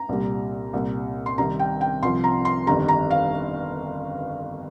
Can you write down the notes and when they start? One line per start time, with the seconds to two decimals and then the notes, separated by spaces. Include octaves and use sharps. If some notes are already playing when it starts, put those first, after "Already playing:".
Already playing: A#5
0.09 C2 A#2 G3
0.73 C2 A#2 G3
1.26 C6
1.38 C2 C3 D#3 G3 A#5
1.59 G5
1.81 G5
2.02 C2 C3 F3 C6
2.24 A#5
2.45 C6
2.67 G1 F2 D#3 G3 A#5
2.88 A#5
3.11 F5